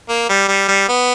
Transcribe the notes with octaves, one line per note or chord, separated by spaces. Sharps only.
A#3
G3
G3
G3
B3